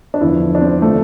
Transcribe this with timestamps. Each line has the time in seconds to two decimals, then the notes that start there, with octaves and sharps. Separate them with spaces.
0.14 D4
0.21 E2 D3 F3 E4
0.55 D4
0.61 C4
0.82 D3 F3 A3